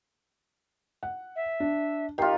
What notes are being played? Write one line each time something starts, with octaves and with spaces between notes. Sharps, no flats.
F#5
E5
D4
D#3 F4 G4 G5 C7